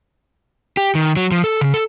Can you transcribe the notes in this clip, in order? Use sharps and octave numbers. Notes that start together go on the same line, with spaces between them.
G4
D#3
F#3
F3
A4
C#3
A4